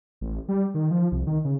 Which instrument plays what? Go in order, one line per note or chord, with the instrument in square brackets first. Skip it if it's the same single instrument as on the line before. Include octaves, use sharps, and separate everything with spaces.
[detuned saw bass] A1
G3
D#3
F3
C2
D#3
C#3